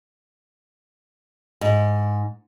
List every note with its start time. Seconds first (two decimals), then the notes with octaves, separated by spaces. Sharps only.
1.61 G#2